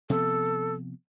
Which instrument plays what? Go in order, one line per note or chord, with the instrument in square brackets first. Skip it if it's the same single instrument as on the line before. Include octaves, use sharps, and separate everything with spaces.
[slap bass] C3 F3 B3 [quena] A4